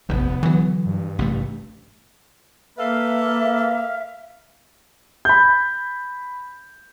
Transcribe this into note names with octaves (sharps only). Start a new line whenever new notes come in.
F1 A#1 D#2 B3
D3 E3 F#3
G2
A1 C3 A3
A#3 A4 B4 E5 F5
B5 G6